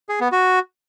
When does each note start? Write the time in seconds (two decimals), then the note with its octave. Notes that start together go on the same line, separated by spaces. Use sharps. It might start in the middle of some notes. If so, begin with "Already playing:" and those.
0.09 G#4
0.21 B3
0.32 F#4